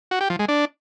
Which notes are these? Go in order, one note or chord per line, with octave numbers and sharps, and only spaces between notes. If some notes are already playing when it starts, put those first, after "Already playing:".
F#4
G4
F3
G#3
D4